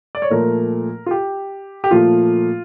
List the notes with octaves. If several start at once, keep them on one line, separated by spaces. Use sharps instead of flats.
D5
C#5
A#2 F3 A3 A#4
F4
G4
G4
A#2 F3 A3 F4